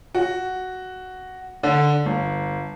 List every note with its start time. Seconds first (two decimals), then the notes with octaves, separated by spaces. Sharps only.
0.15 F#4
1.63 D3
2.06 G1